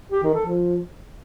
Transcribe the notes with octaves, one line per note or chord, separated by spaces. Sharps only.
G4
D#3
A4
F3